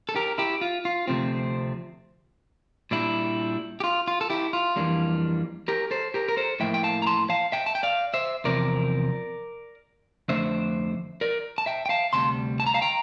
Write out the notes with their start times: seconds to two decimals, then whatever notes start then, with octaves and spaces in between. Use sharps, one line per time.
0.09 A4
0.16 G4 A#4
0.38 E4 G4
0.61 F4
0.85 F4
1.08 D2 C3 F3 A3 C4
2.91 A#2 G3 D4 E4
3.80 G4
3.84 F4
4.08 F4
4.21 A4
4.30 E4 G4
4.53 F4
4.76 F2 E3 G3 A#3 D4
5.68 G4 A#4
5.91 A4 C5
6.14 G4 A#4
6.29 A#4
6.37 A4 C5
6.60 A2 F3 A#3 E5 G5
6.74 G5
6.83 F5 A5
7.02 A#5
7.07 A5 C6
7.30 F5 A5
7.52 E5 G5
7.66 A5
7.75 G5
7.83 D5 F5
8.14 C5 E5
8.44 E2 C3 F3 C4 A#4 D5
10.29 F2 D3 A3 D4 C5 E5
11.21 A#4 D5
11.58 A5
11.66 E5 G5
11.86 G5
11.89 F5 A5
12.13 D2 C3 G3 A5 C6
12.60 A5
12.66 A#5
12.74 F5 A5
12.82 G5 A#5